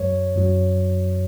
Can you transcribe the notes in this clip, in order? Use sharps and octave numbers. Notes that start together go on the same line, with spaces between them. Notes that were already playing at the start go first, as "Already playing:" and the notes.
Already playing: F#2 F#3 C#5
F#2 F#3